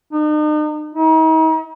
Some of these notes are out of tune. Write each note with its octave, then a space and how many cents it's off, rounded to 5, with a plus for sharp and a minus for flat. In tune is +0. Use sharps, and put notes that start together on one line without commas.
D#4 -40
D#4 +40